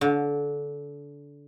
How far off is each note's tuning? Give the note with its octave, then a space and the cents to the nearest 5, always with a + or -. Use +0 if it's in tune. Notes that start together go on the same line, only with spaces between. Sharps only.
D3 -25